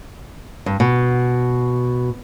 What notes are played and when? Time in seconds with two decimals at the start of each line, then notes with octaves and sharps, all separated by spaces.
0.66 G2
0.80 B2